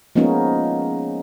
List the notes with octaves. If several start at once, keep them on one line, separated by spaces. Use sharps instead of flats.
F3 G#3 A#3 B3 C#4 D#4